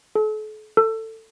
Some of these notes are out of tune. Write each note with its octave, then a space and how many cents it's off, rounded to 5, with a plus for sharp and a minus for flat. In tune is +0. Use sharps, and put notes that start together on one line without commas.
A4 -40
A4 +20